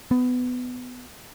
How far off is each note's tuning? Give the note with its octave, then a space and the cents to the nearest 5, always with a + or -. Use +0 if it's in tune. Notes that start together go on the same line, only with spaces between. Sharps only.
B3 +15